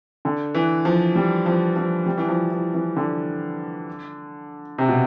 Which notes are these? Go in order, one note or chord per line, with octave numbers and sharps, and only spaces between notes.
D3
E3
F3
G3
F3
F3
G3
E3
F3
E3
E3
D3
C3
B2